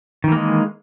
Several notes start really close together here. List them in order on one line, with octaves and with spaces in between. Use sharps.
D#3 E3 A#3 G#3